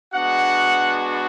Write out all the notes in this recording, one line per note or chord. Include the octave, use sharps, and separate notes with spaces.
G#3 B3 D4 F#4 F#5